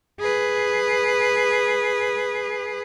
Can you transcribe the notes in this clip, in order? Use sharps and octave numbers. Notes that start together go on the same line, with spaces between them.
G#4 B4